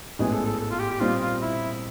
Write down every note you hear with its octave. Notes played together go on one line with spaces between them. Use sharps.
A1 G#2 E3 G#3 B3 G#4
A4
A4
A4
F4
G4
G4
A#2 G3 C4 D#4 F4
F4
E4